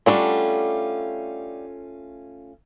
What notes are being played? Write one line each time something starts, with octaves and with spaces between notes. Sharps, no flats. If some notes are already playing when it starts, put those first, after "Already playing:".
G3 A3 C#4 D4 F4 F#4